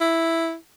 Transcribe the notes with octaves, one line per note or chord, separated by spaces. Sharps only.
E4